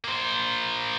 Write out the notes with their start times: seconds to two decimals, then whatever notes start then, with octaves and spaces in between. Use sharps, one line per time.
0.05 A#3 C5